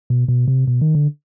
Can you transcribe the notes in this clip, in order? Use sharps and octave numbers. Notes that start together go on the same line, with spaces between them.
B2
B2
C3
B2
D#3
D3